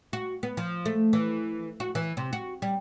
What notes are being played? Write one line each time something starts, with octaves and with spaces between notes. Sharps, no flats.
F#4
B3
F3
A3
E3
F#4
E3
C3
F#4
G3